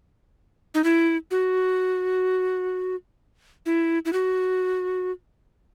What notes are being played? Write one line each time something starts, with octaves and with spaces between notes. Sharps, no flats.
D#4
E4
F#4
E4
E4
F#4